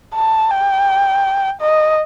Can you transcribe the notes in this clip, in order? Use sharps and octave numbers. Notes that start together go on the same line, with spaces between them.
A5
G5
D#5